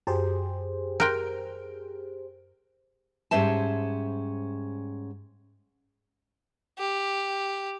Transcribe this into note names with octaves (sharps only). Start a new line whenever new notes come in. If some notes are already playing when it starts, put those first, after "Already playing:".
F#2 G4 G#4 C5
A#4 G5 C6 F#6 G6
G#2 G3 C#4 C5 E5 A5
G4